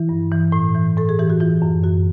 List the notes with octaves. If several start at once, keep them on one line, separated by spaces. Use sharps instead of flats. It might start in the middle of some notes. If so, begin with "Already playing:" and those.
Already playing: E3 E4
G2
E3
A2
E3
A2 A4
G#4
E3 G4
F#4
E3 F4
F#2
F#2 F#4